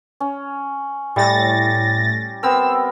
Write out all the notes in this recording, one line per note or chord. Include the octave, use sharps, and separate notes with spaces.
C#4
A2 G3 A6 A#6
B3 C4 A#4 E6